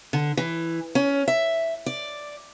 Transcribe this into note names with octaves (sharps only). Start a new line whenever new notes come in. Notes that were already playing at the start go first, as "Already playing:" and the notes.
D3
E3
C#4
E5
D5